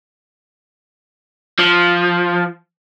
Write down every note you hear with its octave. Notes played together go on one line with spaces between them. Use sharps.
F3